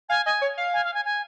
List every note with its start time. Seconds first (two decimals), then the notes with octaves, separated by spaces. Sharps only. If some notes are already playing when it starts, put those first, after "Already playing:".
0.09 F5 G#5
0.26 D#5 G#5
0.41 C#5
0.58 F5
0.73 G#5
0.84 F5
0.94 G#5
1.05 G#5